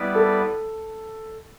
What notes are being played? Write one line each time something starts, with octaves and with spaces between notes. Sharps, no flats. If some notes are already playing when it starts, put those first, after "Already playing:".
Already playing: G3 B3 E4 B4 D5
A4